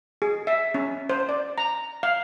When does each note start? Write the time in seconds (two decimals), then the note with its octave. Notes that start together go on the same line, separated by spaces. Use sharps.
0.22 G#4
0.47 E5
0.74 C#4
1.09 C5
1.29 D5
1.58 A#5
2.03 F5